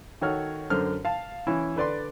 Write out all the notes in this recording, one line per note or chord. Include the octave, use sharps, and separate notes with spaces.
D#3 F#4 A4 C#5 F#5 F6
F#2 D3 C5 F6
F5 A5
E3 C#4 E4
D3 B4 D5 C6